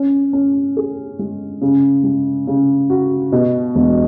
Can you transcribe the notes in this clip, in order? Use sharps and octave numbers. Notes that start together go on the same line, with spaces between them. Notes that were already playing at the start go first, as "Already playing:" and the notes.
Already playing: C#4
C#4
G#4
G#3
C#3
G#3
C#3
F#4
B2
E1